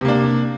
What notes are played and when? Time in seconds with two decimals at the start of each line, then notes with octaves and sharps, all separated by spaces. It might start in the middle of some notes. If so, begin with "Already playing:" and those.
0.01 C3
0.05 A#3
0.08 D4